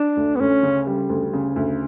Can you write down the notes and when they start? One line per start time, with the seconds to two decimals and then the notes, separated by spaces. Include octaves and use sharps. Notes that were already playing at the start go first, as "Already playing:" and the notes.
Already playing: D4
0.16 D2
0.36 B3
0.40 D2 C#4
0.63 C#3
0.87 G3
1.09 D2
1.33 C#3
1.56 D2